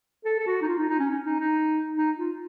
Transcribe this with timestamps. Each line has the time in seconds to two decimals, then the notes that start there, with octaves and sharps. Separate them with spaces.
0.25 A4
0.39 A4
0.47 F#4
0.62 D#4
0.68 F4
0.78 D#4
0.89 D#4
0.99 C#4
1.10 C#4
1.26 D#4
1.40 D#4
1.96 D#4
2.18 F4